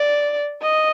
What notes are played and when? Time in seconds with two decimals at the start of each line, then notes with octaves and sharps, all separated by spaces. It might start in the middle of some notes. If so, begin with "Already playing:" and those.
Already playing: D5
0.62 D#5